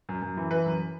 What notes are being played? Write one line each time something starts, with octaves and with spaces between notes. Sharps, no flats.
F#2
F#2
E3
E3 B4
F#2